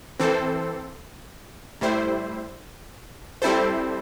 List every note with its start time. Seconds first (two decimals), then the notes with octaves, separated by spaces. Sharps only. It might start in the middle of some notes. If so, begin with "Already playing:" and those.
0.19 E3 C4 A4 C5
1.81 A2 G3 E4 C5
3.42 G3 C4 E4 A4 C5